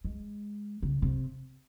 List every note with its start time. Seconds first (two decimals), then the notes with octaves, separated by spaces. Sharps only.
0.04 G#3
0.83 C#3
1.02 C3